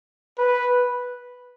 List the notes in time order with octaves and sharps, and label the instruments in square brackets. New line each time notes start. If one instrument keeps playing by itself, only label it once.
[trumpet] B4